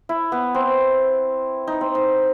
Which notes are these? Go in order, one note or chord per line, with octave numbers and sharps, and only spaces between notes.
E4
B3
C4
D#4
C4
D#4